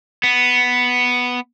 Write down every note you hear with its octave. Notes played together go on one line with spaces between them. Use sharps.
B3